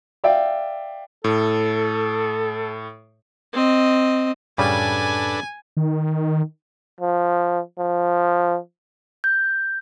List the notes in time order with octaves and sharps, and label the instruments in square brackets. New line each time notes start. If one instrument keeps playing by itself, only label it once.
[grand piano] D5 E5 F5 G5
[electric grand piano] A2 [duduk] A4
[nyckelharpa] C4 D#5
[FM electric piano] F#2 A2 [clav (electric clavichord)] C#3 G3 [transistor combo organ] D4 A4 B4 [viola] G#5
[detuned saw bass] D#3
[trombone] F3
F3
[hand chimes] G6